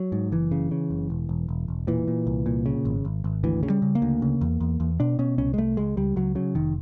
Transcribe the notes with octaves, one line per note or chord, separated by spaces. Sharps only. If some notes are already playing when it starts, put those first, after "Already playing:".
Already playing: F#3
G#2
F#1 E3
C#3
C#3
F#1
E1
E1
E1
E1
A#2 E3
A#2
C2
A#2
C#3
G#1
G#1
G#1
D2 E3
C#3
G3
C#3
A#3
D2
C#3
E2
E2
E2
B2 D4
B2 C#4
C2 C#4
G#3
C2 A3
C#2 G#3
C#2 G3
C#2 F#3
C#3 F#3
F1 D#3